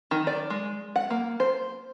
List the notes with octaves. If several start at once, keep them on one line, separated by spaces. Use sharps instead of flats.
D#3
D5
G#3
F#5
A#3
C5